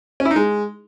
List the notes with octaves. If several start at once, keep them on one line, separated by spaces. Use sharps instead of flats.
C#4
E4
D#4
G#3